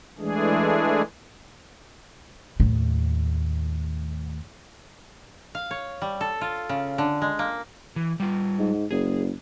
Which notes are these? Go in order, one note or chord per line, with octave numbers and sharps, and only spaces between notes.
E3 G#3 A3 D4 G#4
D#2 A2
F5
C#5
G3
A4
F4
C#3
D3
G#3
A#3
E3
G3 F4
G#2
F#1 G#4